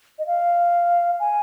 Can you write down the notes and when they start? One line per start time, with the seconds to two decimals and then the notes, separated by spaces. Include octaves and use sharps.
0.19 D#5
0.27 F5
1.20 G#5